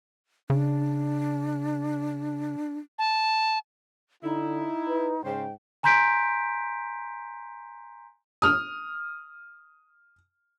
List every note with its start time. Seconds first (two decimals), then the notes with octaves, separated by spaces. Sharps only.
0.50 C#3 D4
2.98 A5
4.23 D3 D#4 E4
4.88 B4
5.25 G#2 C#3 C5 G5
5.83 G#5 A#5 C6 G6 B6 D7
8.42 D#6 F6